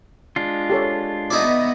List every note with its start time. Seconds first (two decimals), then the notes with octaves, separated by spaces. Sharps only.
0.36 G#3 D4 F4
0.70 G4 A4 C#5
1.31 B3 D#4 E4 D5 D#5